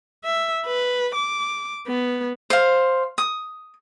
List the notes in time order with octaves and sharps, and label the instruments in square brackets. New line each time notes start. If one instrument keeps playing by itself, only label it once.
[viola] E5
B4
D6
B3
[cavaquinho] C5 F5
D#6